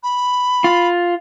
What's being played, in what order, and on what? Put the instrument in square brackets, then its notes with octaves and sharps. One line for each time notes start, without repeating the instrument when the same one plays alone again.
[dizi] B5
[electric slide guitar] F4